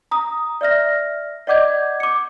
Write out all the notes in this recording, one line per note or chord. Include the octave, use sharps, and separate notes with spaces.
A#5 D#6
D5 E5 F6 A#6
D5 D#5 F#5 D6 G6 G#6
D6 C#7